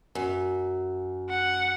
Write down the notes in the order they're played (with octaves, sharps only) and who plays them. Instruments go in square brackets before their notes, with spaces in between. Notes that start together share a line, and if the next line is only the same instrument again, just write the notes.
[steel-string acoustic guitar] F#2
[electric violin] F#5